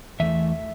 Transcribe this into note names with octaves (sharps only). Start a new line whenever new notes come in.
E2 E3 A3 E5